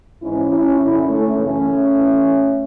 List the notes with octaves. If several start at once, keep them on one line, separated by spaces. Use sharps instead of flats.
G#2 E3 C#4 E4
C#4 E4
F#2 D3 C#4 E4
A3 C#4
F#2 C#3 E3 A3 C#4
A2 E3